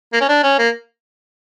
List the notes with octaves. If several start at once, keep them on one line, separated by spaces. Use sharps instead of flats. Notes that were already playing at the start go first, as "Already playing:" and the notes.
A#3
C#4
D4
C#4
A#3